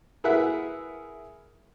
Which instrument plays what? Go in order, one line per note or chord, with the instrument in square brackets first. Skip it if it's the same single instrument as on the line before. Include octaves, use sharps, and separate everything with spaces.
[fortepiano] E4 G#4 A#4 B4 E5 F#5